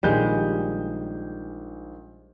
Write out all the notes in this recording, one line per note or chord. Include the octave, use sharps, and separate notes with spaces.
A#1 D#3 G3 G#3 G6